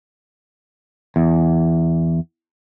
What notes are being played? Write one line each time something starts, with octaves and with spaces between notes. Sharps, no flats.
E2